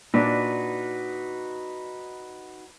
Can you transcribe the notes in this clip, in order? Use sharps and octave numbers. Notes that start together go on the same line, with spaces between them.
A#2 D4 D#4 F#4 B4